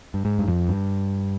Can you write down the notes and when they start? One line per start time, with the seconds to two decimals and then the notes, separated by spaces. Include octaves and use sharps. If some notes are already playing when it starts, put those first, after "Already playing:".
0.14 G2
0.25 G#2
0.39 G2
0.48 F2
0.69 G2